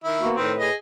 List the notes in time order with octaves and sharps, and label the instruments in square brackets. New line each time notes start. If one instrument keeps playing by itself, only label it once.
[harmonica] D#3 E4
[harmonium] A#3 B3 F#4
[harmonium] A2 B4 [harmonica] D#3 C4
[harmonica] G#4 D#5